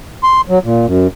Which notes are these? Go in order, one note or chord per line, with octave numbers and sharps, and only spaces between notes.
C6
F#3
A#2
F#2